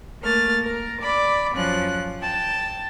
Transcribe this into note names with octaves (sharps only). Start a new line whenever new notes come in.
A3 A#3 F6 A6
A#4
D5 B5 D6
F#2 F3 C#4 F#6
G5 A5